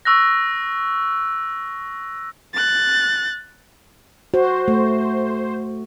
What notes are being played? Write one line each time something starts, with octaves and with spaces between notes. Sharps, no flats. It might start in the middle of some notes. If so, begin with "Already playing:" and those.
C#6 E6 F#6 A#6
F#6 A6
F#4 C5
A3